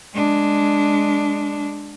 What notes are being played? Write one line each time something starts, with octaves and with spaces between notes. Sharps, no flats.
G#3 D4